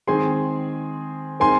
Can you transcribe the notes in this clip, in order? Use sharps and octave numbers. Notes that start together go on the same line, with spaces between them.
D#3 G#3 C4 G#4 G#5 C6
G#3 C4 D#4 A#4 G#5 C6